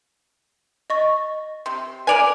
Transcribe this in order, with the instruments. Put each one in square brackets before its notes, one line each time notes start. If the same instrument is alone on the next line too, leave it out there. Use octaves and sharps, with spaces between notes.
[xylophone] D#5 C#6 A6
[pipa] C3 [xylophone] C6
[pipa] A#4 D5 G#5 [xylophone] B4 F7 F#7